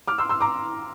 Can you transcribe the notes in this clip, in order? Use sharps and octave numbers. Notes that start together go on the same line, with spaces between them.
D6 F6
C6 E6
C6 E6
A#5 D6